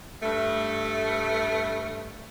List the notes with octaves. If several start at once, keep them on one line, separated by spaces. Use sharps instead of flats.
G2 A3